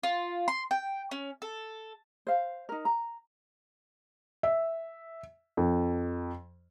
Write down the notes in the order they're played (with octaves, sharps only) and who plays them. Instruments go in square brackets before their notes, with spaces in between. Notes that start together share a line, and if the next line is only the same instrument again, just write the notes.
[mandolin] F4
C6
G5
C#4
A4
[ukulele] C5 F5
D#4 A#4
A#5
[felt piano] E5
F2